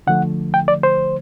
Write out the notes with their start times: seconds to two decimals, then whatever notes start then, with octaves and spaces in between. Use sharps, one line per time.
0.07 D3 F3 A3 F#5
0.54 G5
0.68 D5
0.83 C5